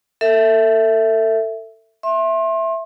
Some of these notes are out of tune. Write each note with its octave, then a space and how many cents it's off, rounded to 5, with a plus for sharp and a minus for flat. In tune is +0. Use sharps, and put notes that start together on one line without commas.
A4 +30 E5 +0
E5 +0 C6 +35